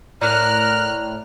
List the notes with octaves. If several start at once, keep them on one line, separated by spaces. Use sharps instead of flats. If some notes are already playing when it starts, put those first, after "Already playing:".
A2 A#4 D5 A#5 F6 F#6